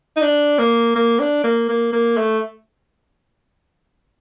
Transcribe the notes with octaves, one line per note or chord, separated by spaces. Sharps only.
D#4
D4
A#3
A#3
D4
A#3
A#3
A#3
A3